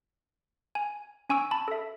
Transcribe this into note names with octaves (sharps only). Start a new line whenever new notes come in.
G#5
C#4 G#5 C#6 E6 D7
A5 B5
A4 E5